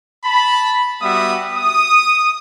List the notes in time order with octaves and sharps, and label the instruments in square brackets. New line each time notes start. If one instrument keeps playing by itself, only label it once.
[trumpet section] A5 B5
G3 B3 F#4 E5 D#6
D#6